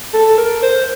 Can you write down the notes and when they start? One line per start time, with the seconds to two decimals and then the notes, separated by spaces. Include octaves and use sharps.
0.14 A4
0.38 A#4
0.63 C5